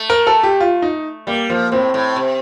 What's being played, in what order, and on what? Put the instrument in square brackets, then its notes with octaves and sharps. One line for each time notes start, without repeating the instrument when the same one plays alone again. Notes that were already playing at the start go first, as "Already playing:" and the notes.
Already playing: [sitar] A3
[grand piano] A#4
A4
G4
F4
D#4
[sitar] G3 [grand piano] A#3
[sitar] F3 [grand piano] A#3
[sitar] A2 [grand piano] C4
[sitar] A2
C3